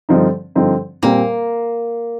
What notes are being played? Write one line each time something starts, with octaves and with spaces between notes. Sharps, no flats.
G2 D3 F3 C4 D#4
G2 D3 F3 C4 D#4
A#2 G3 A#3 C4